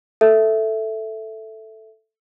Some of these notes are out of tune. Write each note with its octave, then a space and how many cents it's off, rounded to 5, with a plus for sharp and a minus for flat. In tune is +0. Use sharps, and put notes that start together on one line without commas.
A4 +0 E5 +0